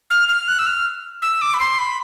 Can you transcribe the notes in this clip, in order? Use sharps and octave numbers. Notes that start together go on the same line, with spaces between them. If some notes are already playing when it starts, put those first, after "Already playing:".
F6
F6
F#6
E6
F6
E6
D6
B5
C6
B5